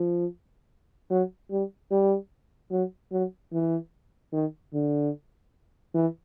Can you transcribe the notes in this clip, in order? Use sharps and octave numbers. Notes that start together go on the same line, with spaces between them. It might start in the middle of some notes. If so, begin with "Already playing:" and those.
Already playing: F3
F#3
G3
G3
F#3
F#3
E3
D#3
D3
E3